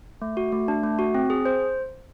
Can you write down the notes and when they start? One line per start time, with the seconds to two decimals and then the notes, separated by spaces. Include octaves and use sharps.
0.22 A3
0.37 F#4
0.52 A3
0.68 D4
0.83 A3
0.99 F#4
1.15 C4
1.30 G#4
1.45 C5